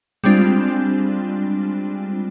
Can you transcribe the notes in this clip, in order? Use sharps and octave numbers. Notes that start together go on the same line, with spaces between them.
G3 G#3 C4 D4 F4